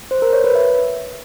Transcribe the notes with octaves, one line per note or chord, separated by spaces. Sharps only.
C5
A#4
C#5
B4
E5